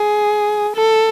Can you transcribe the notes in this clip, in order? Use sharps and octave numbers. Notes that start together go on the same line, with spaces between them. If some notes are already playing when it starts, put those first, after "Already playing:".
Already playing: G#4
A4